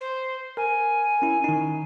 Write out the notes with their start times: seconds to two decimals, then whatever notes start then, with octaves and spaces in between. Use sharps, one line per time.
0.01 C5
0.57 A#4 G#5
1.22 C#4 E4
1.44 D#3 D#4